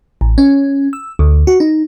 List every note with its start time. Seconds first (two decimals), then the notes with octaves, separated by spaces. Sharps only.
0.21 A1
0.38 C#4
0.93 E6
1.19 D2
1.47 F#4
1.60 D#4